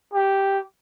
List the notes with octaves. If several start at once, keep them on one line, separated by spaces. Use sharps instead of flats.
G4